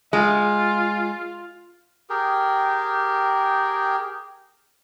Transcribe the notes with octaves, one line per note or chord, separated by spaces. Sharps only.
G#3 F4
G4 G#4 A#4 G5